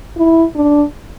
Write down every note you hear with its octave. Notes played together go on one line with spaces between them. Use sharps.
E4
D4